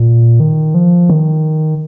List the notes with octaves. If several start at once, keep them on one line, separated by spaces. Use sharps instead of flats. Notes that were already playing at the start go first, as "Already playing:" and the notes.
Already playing: A#2
D#3
F3
D#3